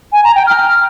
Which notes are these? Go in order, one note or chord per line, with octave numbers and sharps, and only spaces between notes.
G#5
A#5
G5
F6